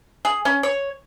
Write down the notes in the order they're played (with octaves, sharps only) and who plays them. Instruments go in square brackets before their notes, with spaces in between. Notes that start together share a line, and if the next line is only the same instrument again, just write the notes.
[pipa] G#4
C#4
C#5